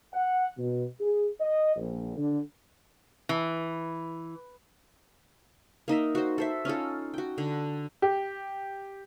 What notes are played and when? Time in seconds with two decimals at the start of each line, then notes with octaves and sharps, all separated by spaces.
0.13 F#5
0.57 B2
1.01 G#4
1.40 D#5
1.76 A#1
2.16 D3
3.29 E3
5.88 A#3 D#4 D#5 E5
6.15 F#4 C5
6.38 A4 C5 E5
6.65 C#4 D#4 F4 A4
7.14 F#4 G5
7.38 D3
8.02 G4